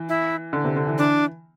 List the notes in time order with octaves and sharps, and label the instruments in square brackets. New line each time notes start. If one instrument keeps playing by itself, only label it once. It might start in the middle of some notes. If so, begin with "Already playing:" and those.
Already playing: [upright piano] E3
[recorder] E4
[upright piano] D3
C3
D3
E3
[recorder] D4